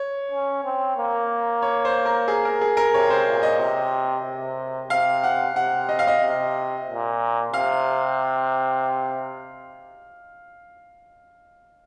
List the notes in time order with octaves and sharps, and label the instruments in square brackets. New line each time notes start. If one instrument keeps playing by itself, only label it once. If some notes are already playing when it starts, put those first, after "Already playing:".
Already playing: [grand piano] C#5
[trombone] C#4
C4
A#3
[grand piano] C#5
C5
A#4
G#4
A#4
G#4
A#4
[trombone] C3 [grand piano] C#5
[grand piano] C5
[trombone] A#2
[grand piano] D#5
[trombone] C3
C3
[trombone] C3 [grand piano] F5
[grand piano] F#5
[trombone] C3 [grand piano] F#5
[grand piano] D#5
F5
D#5
[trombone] C3
A#2
[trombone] C3 [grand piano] F5